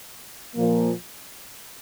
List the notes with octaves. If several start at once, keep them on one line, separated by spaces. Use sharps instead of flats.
A#2 F3 A#3